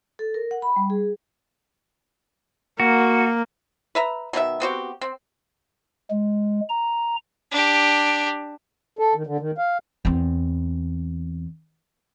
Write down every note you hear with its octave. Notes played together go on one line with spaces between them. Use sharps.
A4
A#4
F#5
B5
G3
G#4
A#3 F#4
B4 E5 A#5
B2 D#3 D#4 E5
B3 C4 F#4 G4
C4
G#3
A#5
D4 G4
A4
D#3
D3
D#3
F5
E2 C4